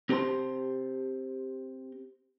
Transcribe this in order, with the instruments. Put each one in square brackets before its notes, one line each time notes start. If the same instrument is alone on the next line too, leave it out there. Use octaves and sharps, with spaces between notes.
[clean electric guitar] C4 G4 C5 G#5 A5 C6